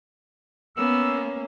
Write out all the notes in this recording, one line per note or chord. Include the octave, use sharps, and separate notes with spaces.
A#3 B3 C#4 E6